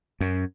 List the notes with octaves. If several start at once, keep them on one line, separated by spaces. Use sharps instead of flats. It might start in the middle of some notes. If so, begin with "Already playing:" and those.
F#2